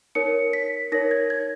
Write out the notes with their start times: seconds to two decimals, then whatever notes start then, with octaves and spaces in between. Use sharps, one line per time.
0.15 D#4 A#4 C#5 C#7
0.53 B6
0.92 D#4 A#4 C#5 A#6
1.11 G#6
1.30 G#6